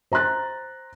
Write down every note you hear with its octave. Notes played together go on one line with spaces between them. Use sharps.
C5 A#5 C6 F#6 A6